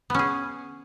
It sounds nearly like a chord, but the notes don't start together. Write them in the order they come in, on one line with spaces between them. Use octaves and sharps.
B3 C#4 G#4